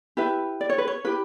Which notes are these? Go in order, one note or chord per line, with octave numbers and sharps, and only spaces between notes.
E4 G4 B4 E5
D5
C#5
B4
C#5
E4 G4 B4